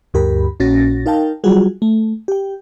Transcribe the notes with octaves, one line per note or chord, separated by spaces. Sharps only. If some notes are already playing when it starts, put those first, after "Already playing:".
D2 G2 G4 A#4 B5
A#1 A#2 C#4 F#4 A6 A#6
D#4 A#4 F5 G5 A5
F#3 G3 F4 F#4 G#4
A3
G4 G5